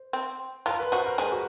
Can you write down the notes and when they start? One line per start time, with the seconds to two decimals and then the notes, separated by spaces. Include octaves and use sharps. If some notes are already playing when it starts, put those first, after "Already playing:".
Already playing: C5
0.13 C4
0.66 F3 F4 A#4
0.80 B4
0.92 F#3 F#4 C5
1.06 A#4
1.18 G#3 G#4 B4
1.32 F#4